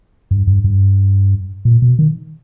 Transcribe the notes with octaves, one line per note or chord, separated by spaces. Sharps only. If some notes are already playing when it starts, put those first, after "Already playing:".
G2
G2
G2
A#2
B2
D#3